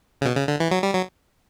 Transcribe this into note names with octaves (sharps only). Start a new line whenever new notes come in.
C#3
B2
C#3
D3
E3
F#3
G3
F#3